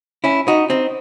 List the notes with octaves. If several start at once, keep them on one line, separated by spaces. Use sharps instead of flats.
C#4 E4
D#4 F#4
C4 D#4